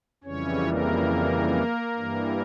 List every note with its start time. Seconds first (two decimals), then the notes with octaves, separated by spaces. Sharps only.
0.24 F2 C#3 E3 G3 C#4 C#5
0.67 A#3 A#4
1.97 G2 E3 G3